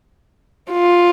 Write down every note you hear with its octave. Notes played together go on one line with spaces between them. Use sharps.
F4